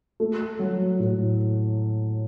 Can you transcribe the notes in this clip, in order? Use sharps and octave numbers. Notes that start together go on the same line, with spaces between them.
A3
F#3
A2